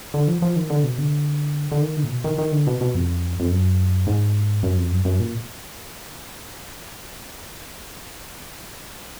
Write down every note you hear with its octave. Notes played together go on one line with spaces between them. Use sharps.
D3
F3
F3
D#3
D3
B2
D3
D3
D#3
D3
A#2
B2
D#3
D#3
D3
B2
B2
F2
F2
F#2
G#2
F#2
F2
F#2
F#2
A#2